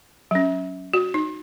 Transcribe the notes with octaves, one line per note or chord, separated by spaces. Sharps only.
F#3 C#4
F#4
D#4